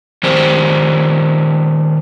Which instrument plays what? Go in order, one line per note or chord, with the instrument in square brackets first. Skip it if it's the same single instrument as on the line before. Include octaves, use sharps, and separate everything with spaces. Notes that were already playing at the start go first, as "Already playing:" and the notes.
[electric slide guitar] D#3 G3 C5